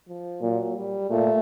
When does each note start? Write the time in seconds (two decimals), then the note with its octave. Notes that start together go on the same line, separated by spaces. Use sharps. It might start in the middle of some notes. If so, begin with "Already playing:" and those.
0.08 F3
0.42 A#2 F#3
0.76 G3
1.10 A#2 A3